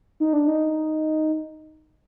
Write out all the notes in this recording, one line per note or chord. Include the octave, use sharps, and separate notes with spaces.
D#4
D4
D#4